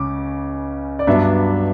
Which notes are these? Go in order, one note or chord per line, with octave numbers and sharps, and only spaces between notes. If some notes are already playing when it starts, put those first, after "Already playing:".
Already playing: C#2 C#3 C#4 D6
D5
G2 F#3 B3 D4 E5